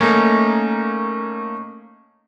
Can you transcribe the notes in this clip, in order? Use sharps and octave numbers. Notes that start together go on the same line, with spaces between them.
A3 A#3 C#4 D#4